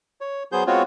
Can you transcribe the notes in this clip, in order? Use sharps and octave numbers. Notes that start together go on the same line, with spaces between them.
C#5
F#3 B3 G#4 C5 G6
G#3 B3 C4 F4 F#4 C#5